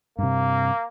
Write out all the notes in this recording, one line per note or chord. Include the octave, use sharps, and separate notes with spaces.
G2 C3 A#3